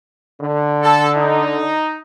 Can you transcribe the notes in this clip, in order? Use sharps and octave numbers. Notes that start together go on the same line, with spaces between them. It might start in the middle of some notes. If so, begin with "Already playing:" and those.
D3
A4
D#4